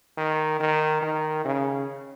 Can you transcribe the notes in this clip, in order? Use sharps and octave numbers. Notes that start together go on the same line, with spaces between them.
D#3
D#3
D#3
C#3